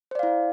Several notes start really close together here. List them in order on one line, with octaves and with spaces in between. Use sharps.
C5 D5 F5 E4